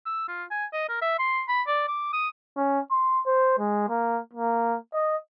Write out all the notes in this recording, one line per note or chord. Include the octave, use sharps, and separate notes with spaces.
E6
F4
G#5
D#5
A#4
E5
C6
B5
D5
D6
D#6
C#4
C6
C5
G#3
A#3
A#3
D#5